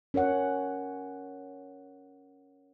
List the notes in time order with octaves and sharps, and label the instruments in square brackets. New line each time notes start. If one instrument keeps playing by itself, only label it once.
[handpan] C#4 A#4 C#5 F#5